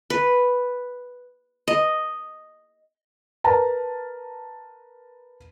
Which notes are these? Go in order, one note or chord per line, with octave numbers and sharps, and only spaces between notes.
B4
D#5
A#4 B4 A5 A#5